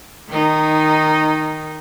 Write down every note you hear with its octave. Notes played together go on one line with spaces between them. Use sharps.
D#3 D#4